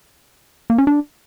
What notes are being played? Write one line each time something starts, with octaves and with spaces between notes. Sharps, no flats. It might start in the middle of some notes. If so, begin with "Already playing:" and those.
A#3
C#4
D4